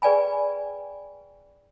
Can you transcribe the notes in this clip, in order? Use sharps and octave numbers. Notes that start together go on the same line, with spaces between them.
G#4 B4 D5 G5 G#5 B5